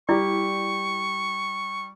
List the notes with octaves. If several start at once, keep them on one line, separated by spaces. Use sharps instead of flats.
G3 E4 G4 D5 C#6